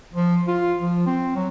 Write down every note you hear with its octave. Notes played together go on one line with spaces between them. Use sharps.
F3
F4
F3
C4
F#3